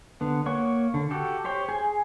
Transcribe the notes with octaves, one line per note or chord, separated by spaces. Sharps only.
D3 B3
A#3 C#5 F#5 C#6
D3
F#4 G4 A4
G4 C5 C#5 G5
G#4 G#5